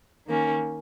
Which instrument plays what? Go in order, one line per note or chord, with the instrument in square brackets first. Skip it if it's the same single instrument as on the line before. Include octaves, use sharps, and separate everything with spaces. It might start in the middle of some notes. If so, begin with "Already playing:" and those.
[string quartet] D#3 A#3 C#4